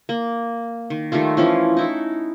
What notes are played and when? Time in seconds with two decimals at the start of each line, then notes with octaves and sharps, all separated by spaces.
0.09 A#3
0.90 D#3
1.12 D#3 G3 A3 F4
1.37 E3 F3 C#4 F4
1.77 D#4 E4 A4